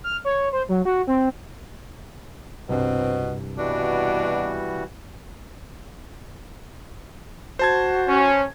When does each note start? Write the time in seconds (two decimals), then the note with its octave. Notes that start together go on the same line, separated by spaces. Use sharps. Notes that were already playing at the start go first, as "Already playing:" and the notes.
0.04 F6
0.25 C#5
0.53 C5
0.69 F#3
0.85 F#4
1.07 C4
2.69 C2 G2 B2 C4
3.58 B2 E3 G3 D4 F#4
7.59 F#4 C5 A5 G#6
8.08 C#4